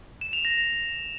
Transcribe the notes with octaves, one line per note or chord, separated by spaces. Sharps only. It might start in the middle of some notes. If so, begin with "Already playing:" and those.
E7
F7
A#6